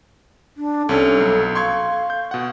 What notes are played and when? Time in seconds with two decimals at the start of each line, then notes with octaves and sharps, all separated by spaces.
0.57 D4
0.89 C2 C#4 A4
1.20 B1
1.55 F5 C6 C#6 G#6
2.10 G6
2.31 B2 F#5